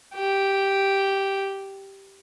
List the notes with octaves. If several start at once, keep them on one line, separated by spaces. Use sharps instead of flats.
G4